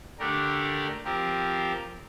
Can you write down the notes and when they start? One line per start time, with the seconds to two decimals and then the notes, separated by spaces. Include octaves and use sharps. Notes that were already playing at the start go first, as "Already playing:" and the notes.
0.19 D3 A3 D4 G4 A#4
1.04 F3 C4 G4 A#4